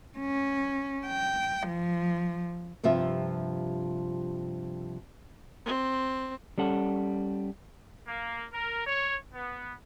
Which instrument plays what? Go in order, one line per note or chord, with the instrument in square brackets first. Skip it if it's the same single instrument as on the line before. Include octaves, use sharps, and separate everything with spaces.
[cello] C#4
G5
F3
[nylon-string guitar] G2 C3 F3 F4 E5
[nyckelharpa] C4
[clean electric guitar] G3 C#4 A4 F#5
[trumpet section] A#3
A#4
C#5
B3